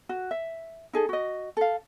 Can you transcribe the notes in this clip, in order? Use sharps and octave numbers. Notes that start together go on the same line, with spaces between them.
F#4
E5
D#4 G#4 A4
F#4 D#5
A4 F5